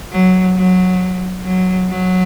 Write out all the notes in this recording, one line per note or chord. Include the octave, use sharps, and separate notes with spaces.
F#3
F#3
F#3
F#3